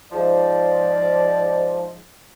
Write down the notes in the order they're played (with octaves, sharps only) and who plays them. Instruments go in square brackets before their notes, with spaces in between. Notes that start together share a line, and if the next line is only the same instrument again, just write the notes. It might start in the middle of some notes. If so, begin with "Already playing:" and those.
[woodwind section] G#2 F3 [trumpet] D5